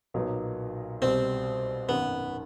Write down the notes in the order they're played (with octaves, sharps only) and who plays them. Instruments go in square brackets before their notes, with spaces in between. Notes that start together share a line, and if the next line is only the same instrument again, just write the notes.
[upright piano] B1 A#2 F#3 B3 D#4
[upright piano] C2 B2 G3 [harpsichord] C4
[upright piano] G#1 F#2 D#3 [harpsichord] B3